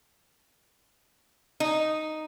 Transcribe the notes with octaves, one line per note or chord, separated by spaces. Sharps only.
D#4